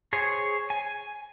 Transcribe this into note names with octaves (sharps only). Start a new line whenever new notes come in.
G#4 C5 C#5 G#5
G#5